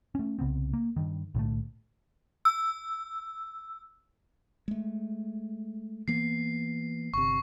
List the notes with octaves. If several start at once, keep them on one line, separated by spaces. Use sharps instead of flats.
A3 C#4
C2 C#3 B3 C4
A#3
G2 D#3
B1 A2 D3 A3
E6
G#3 A3
E3 A#3 B3 C7
G1 C3 C#6